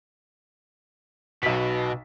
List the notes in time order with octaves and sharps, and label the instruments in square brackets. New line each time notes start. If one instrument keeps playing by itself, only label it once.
[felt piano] B1 B6 [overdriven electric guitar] B2